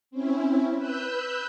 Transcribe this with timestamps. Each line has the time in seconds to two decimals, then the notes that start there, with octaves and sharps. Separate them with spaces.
0.11 C4 C#4 E4
0.76 B4 E6 F#6 G6